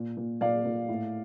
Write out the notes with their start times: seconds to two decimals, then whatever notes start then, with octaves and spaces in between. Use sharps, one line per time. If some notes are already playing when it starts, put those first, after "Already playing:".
Already playing: A#2
0.17 A#2
0.41 A#2 D5 F5
0.65 A#2
0.89 A2